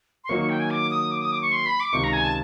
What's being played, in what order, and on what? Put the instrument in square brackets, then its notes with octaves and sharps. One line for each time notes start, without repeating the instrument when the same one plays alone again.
[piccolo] C6
[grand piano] D#3 F#3 A#3 [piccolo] C#6
[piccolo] C#6
G5
G#5
D6
D#6
D6
D#6
D6
C#6
C6
B5
D6
[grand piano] C#2 C3 D#3 [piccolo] C#6
[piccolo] A#5
G#5
A5